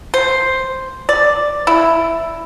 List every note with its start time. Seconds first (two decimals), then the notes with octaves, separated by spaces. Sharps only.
0.14 C5
1.09 D5
1.67 E4